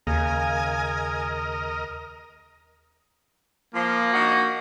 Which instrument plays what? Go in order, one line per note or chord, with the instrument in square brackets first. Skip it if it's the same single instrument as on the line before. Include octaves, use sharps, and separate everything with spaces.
[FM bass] D#2 [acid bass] C#3 [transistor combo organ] A#4 D#5 [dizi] G#5
[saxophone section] F3 [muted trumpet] A#3
[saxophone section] D4 D#4 F#4